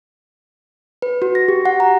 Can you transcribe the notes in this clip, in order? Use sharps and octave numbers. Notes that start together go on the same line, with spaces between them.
B4
F#4
A#6
G4
F#5
A#5